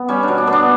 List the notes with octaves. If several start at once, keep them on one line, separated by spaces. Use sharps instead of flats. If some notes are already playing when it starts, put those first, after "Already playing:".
Already playing: B3
G3 C#4
D4
B2
D4
B3
D4